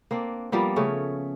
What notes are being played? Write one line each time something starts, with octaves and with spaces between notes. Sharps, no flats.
A#3 C4 D4
F3 G3 A#3 B3
C#3 A3 C#4